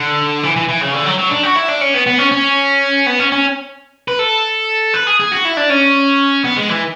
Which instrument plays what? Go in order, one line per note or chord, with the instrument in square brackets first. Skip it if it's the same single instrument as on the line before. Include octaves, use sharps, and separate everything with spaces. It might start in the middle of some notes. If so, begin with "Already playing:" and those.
Already playing: [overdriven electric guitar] D3
E3
E3
E3
C#3
D3
F#3
F#3
D4
F#4
E4
D4
C#4
B3
B3
C#4
C#4
B3
C#4
C#4
B4
A4
B4
G#4
G#4
F#4
E4
D4
C#4
B3
G#3
E3